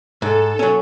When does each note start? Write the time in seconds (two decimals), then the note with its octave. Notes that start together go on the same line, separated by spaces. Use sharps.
0.22 G#2 A4
0.59 F#3 C#4